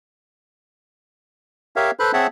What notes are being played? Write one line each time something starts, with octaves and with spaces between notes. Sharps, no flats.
G4 A#4 C#5 E5 F5
A4 B4 C5 B5 F#6
C4 G#4 C#5 E5 F#5 A5